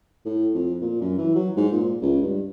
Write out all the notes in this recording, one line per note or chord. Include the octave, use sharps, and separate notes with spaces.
A2
F2
A#2
F#2
E3
F#3
G#2
A#2
C#2
G2